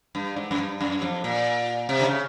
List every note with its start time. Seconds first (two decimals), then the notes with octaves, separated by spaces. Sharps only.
0.15 G2
0.36 G#2
0.51 F#2
0.58 G2
0.81 F#2
1.02 F2
1.24 A#2
1.89 C3
2.00 D3
2.05 C#3